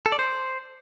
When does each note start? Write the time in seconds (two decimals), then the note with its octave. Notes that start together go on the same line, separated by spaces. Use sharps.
0.06 A4
0.12 D5
0.19 C5